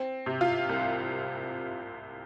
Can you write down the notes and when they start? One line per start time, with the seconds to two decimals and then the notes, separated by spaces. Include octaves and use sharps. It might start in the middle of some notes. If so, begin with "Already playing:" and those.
Already playing: C4
0.26 C3
0.41 F4 F5
0.69 C2